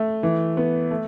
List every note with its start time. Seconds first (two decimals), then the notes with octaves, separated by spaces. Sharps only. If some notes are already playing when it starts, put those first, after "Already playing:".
Already playing: A3
0.23 E3
0.57 B3
0.91 A3